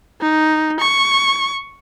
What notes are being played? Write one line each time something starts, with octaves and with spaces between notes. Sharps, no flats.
D#4
C#6